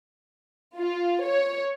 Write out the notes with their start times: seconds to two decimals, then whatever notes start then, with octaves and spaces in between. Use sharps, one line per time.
0.77 F4
1.25 C#5